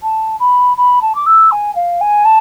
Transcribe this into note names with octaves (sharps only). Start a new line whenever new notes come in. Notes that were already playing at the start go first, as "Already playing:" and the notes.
A5
B5
B5
A5
D6
E6
G#5
F5
G#5
A5